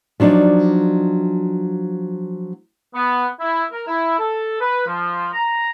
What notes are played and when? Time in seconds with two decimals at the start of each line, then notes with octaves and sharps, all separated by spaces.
0.20 F3 F#3 D4 D#4 D5
2.95 B3
3.40 E4
3.72 A#4
3.87 E4
4.19 A4
4.60 B4
4.86 F3
5.33 A#5